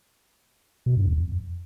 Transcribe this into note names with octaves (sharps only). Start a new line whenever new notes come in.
B2
G2
E2
F2